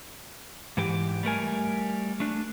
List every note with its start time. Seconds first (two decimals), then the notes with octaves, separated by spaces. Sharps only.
0.77 G#2 E3 G4
1.23 G3 A3 A#4 G#5
2.20 A3 D4